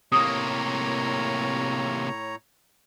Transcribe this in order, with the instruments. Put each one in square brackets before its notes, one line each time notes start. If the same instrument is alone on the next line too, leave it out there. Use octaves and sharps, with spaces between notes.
[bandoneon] A2 C#5 A#5 [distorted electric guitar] C3 A#3 [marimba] D#6